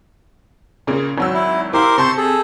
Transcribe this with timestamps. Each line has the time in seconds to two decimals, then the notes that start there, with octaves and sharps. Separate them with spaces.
0.87 A#2 C#3 A#3
1.18 G#1 F#3 E6
1.34 E4
1.73 E4 G4 A#4 C5 F5
1.98 C3 C5 A5 C6 C#6 G6
2.17 G#4 A4